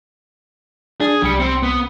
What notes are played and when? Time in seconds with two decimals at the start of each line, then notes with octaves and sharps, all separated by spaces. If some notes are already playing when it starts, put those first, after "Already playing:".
1.01 D4 G#4
1.23 C2 G3 C#7
1.40 C4
1.63 B3